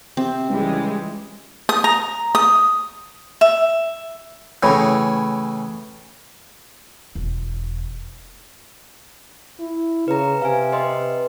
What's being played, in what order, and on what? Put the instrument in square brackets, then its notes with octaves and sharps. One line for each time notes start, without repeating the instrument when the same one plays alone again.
[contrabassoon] C3 [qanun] C4
[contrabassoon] C#2 [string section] E3 G3 G#3
[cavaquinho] D#6
A#5
D#6
E5
[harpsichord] A2 C#3 E3
[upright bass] E1
[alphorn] E4
[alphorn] C#3 [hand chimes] B4 A#5
[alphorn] C3 [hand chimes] F5 G#5
[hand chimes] B4 D#5 C6